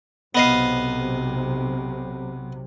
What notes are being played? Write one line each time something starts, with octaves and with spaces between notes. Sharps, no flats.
B1 C3 B3 D#5 F5